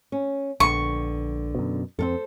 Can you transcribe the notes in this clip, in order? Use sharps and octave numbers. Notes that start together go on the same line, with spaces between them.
C#4
A#1 D3 B3 C#6
F#2 B2
F2 C4 A4 A#4 C5